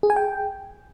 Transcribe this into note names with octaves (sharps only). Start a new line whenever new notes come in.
G#4
G#5
G5